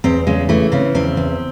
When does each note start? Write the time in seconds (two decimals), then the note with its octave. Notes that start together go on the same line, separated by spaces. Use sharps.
0.04 E2 C4
0.27 C#3 G#3
0.49 E3 A3
0.72 C#3 C4
0.95 E2 C4
1.17 E2